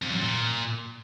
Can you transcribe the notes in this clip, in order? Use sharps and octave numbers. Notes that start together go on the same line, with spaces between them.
F2
F#2
A#2